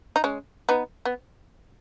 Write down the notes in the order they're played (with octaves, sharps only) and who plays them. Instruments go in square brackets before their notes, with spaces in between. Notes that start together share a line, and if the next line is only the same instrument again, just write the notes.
[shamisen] D#4
G#3 C#4
B3 D#4
B3